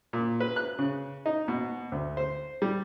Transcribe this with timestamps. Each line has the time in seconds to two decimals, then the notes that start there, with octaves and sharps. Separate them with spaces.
0.13 A#2
0.40 B4
0.56 F#6
0.79 C#3
1.26 D#4
1.48 B2
1.92 D2
2.17 C5
2.62 G3